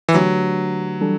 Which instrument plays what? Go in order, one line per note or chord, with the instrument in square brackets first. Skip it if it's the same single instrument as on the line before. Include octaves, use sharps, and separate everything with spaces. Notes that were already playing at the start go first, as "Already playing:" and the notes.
[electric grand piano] E3
[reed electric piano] D3 A3 D4 G4 B4 [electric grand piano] F#3
[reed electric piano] E3 G3 D4 A4